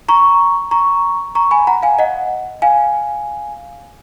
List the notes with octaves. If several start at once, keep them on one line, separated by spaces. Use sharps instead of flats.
A#5 C#6
A#5 C#6
A#5 C#6
G#5 B5
F#5 A#5
F5 G#5
D#5 F#5
F5 G#5